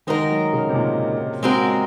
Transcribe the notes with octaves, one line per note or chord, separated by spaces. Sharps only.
D#3 G#3 D#4 F#4 A#4
F#3
C#3
C3
A#2
G#3 C4 F#4 A#4